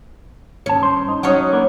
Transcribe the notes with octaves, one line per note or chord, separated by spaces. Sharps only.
D#2 C#4 A5
G2 C5
D#4
F#3 C#4 D#4 F#4 C#5
A#3 B3 D4